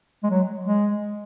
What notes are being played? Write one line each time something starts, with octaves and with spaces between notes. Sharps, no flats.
G#3
F#3
G#3